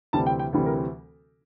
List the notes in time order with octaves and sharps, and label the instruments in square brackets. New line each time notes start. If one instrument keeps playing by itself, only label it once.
[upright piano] D2 C3 E3 G3 C4 A5
G5
G5
D2 C3 E3 G3 C4
A#4